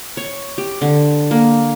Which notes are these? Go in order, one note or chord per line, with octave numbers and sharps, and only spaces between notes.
C#5
G4
D3
A#3